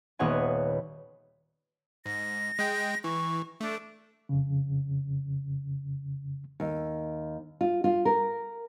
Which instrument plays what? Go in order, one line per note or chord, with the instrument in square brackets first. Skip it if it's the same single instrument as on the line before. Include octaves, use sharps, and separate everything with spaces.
[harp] D#1 B3 C#5 F#5 G#5
[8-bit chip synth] G#2 [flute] A#6
[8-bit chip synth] G#3 G5
[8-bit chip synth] E3 [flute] C#6
[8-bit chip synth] A3 [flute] D4
[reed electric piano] F2 C#3
[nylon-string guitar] D#2
F4
F4
A#4